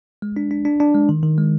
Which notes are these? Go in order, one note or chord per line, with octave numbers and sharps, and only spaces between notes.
G#3
D4
D4
D4
D4
G#3
D#3
D#3
G#3